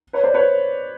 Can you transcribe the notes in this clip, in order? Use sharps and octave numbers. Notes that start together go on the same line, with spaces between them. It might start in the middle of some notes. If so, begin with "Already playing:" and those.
B4 C#5
C5 D5
B4 C#5